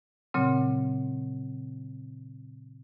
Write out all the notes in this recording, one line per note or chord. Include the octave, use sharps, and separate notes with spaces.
A#2 C#3 F#3 C4